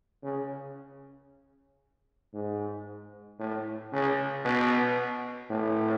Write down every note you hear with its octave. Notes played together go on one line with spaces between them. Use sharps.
C#3
G#2
A2
C#3
B2
A2